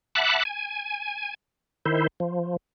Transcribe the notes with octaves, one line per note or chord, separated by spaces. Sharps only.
E5 F#5 A5 B5 D6 F#6
G#5
D#3 E4 C5
F3